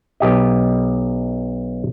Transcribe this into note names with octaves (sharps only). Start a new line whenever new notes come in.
B1 G4 D#5